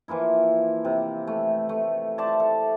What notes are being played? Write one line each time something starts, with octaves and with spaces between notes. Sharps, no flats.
E3 F3 A#3 E4
C3
A3
A3
C5 D5 E5 A5
A4